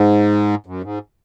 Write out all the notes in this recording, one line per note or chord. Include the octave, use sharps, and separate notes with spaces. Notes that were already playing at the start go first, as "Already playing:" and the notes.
Already playing: G#2
F#2
G#2